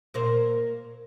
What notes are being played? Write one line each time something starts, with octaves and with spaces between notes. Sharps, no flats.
A#2 A#4 C5